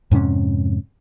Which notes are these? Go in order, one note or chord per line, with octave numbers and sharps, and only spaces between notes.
F2 G#2 C3 C#4